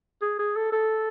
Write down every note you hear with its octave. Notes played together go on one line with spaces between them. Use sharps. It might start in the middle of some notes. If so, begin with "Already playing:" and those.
G#4
G#4
A4
A4